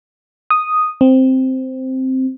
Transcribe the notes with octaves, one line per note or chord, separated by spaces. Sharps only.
D#6
C4